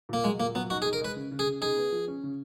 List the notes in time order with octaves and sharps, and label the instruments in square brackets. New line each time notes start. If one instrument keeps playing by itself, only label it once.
[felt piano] A#2 [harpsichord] A#3
[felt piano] F#3 [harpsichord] G#3
[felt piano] A#2 [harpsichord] A#3
[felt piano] F#3 [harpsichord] B3
[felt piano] D#4 [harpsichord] F#4
[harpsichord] G#4
[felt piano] D#4
[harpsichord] A#4
[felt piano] G#3 [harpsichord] B4
[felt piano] C#3
C#3
[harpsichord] G#4
[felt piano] C#3
[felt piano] D#4 [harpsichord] G#4
[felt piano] B3
F3
C#4
C#3